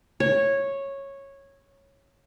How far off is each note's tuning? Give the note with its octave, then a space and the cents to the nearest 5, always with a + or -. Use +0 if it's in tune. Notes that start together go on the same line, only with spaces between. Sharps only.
C#5 -10